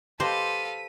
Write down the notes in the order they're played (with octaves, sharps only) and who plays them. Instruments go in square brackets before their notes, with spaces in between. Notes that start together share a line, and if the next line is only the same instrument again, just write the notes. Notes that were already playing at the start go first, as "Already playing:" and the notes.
[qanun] G4 B4 D#5 [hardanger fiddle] A4 F5 [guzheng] C5 [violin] B6 D#7